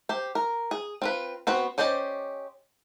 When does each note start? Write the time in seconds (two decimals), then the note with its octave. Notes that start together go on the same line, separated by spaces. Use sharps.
0.09 G4 C5
0.35 A#4
0.71 G#4
1.02 C4 F4 B4
1.47 B3 C4 F#4 B4
1.78 C#4 G4 C5 D5 D#5